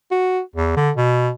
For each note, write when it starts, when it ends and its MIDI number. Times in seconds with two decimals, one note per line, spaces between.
0.11 0.40 66
0.56 0.72 40
0.77 0.91 50
0.97 1.30 47